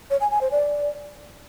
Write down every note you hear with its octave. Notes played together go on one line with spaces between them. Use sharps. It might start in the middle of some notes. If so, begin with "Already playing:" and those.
C#5
G#5
G#5
C5
D5